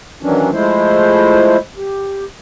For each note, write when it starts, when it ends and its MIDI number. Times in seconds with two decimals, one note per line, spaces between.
0.23 0.50 51
0.23 0.50 52
0.23 0.50 54
0.23 0.50 61
0.23 0.50 62
0.52 1.57 53
0.52 1.57 56
0.52 1.57 57
0.52 1.57 64
0.52 1.57 72
1.77 2.25 67